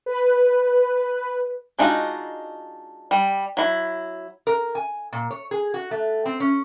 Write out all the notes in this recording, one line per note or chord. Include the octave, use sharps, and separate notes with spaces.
B4
G#3 D4 D#4 F4 F#4
G3
F#3 E4
A#4
G#5
A#2
C#5
G#4
F#4
A3
C4
C#4